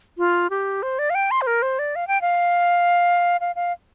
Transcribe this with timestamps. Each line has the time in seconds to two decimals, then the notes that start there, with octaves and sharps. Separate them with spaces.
0.18 F4
0.50 G4
0.83 C5
0.99 D5
1.10 F5
1.15 G5
1.31 C6
1.42 C5
1.47 A#4
1.62 C5
1.79 D5
1.96 F5
2.08 G5
2.21 F5
3.41 F5
3.56 F5